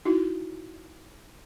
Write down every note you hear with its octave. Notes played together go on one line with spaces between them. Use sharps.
D#4 E4 F#4